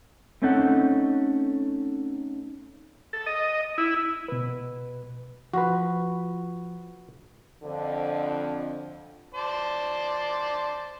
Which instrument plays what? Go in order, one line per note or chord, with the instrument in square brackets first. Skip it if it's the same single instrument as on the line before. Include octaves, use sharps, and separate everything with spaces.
[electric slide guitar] A3 C4 C#4 D#4 A4 F#5
[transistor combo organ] A4
D#5
E4
[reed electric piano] B2 B4
[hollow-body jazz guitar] F3 [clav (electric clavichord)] F#4 B4
[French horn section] F2 D3
[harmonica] C5 D5 A5